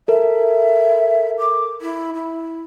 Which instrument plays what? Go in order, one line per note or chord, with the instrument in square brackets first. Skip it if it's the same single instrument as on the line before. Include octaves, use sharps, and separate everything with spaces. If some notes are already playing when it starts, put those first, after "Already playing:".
[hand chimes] A4 A#4 [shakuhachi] E5
[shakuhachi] D6
E4
E4